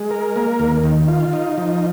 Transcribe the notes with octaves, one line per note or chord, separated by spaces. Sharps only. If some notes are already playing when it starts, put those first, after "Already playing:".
Already playing: G#3
A#4
A#3
D#2
D#3
F4
D#4
F3